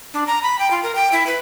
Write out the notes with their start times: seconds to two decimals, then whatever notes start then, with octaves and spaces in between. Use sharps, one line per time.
0.14 D4
0.27 A#5
0.43 B5
0.59 G5
0.71 F4
0.83 A#4
0.95 G5
1.12 E4
1.27 B4